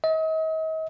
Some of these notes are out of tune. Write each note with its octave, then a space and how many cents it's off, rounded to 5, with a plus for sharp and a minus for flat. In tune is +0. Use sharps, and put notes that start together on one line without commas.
D#5 +40